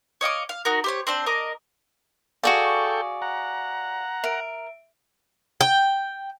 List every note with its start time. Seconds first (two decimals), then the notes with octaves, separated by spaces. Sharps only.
0.21 C#5 D#5 F5 D6
0.49 F5
0.65 D#4 F#4 A#4
0.84 G4 C5 C#5
1.07 C4 D4 C5
1.26 A#4 D#5 D6
2.43 F#4 G#4 A4 D5 F5 G5 C#6
3.22 F#5 A#5
4.24 A#4 E5 D7
5.61 G5